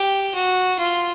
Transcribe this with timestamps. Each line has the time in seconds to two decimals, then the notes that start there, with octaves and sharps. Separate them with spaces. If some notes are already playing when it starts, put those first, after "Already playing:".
Already playing: G4
0.35 F#4
0.78 F4